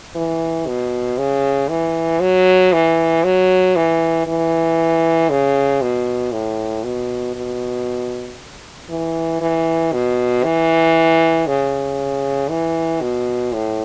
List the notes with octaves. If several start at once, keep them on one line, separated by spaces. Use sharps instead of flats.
E3
B2
C#3
E3
F#3
E3
F#3
E3
E3
C#3
B2
A2
B2
B2
E3
E3
B2
E3
C#3
E3
B2
A2